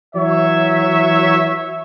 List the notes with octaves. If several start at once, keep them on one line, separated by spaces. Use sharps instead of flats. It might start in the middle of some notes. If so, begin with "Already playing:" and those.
E3 F#3 C#5 E5